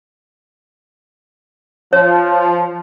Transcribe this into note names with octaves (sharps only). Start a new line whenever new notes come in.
F3 C#5